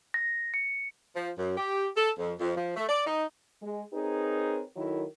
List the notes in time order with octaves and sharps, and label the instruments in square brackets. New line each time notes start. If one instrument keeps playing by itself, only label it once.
[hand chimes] A#6
C#7
[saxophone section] F3
F#2
G4
A4
F2
F2
F3
A3
D5
D#4
[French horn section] G#3
C4 D#4 G#4 A#4 B4 C#5
D#3 F#3 E4 A4 A#4